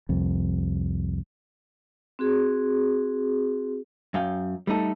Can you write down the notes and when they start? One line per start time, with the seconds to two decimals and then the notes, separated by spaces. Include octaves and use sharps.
0.09 C2 F2
2.19 C4 F#4 G#4
4.14 F#2 F5 G5
4.67 G3 A3 D#4 A4